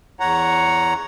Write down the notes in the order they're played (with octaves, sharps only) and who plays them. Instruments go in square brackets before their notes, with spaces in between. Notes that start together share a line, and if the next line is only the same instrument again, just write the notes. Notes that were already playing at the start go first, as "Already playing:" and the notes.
[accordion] E2 C#5 F#5 A#5